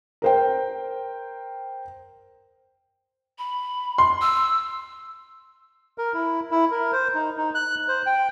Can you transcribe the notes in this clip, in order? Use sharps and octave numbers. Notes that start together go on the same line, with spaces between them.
A#4 C5 G5
B5
C6
E6
A#4
E4
E4
A#4
C5
D#4
D#4
F#6
C5
G5